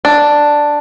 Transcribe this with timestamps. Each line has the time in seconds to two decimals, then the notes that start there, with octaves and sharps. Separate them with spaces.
0.05 D4